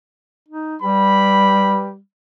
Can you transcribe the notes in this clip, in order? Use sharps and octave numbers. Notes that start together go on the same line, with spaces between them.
D#4
G3 G4 B4 B5